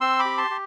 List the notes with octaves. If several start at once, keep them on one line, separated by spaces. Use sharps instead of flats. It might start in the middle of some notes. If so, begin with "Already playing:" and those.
C4 C6 E6
B5 D6
G4
A5 C6
G4